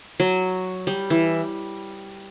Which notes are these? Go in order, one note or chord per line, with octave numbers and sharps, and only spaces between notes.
F#3
G3
E3